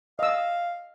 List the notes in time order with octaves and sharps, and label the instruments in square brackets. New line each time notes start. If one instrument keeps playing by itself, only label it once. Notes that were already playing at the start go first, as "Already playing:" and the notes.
[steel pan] D#5 E6 [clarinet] F5